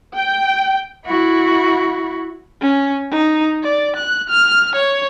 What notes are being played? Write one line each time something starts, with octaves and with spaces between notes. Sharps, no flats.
G5
E4 F#4
C#4
D#4
D5
F#6
F6
C#5